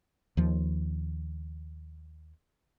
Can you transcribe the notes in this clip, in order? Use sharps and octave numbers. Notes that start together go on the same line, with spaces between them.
D#2 F3